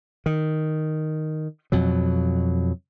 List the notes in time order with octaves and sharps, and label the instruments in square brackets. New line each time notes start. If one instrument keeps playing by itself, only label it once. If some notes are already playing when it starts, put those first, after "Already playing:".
[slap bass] D#3
F2 B2 F#3